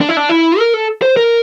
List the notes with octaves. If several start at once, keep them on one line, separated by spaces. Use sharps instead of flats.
D4
E4
D4
E4
A#4
A4
C5
A#4